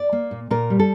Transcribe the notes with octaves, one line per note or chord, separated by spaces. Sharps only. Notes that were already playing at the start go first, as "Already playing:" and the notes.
Already playing: D5
A#3
A#2
A#2 A#4
G3
A4